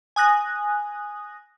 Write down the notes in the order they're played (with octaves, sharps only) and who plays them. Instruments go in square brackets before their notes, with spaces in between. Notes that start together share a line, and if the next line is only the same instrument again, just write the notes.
[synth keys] G#5 D#6 F#6 A#6